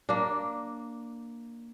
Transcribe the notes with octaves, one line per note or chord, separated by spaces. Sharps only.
A#3 D4